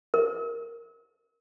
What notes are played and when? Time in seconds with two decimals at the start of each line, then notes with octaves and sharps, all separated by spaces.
0.14 A#4